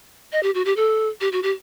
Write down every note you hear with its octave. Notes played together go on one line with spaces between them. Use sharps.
D#5
G4
F#4
G4
A4
G4
F#4
G4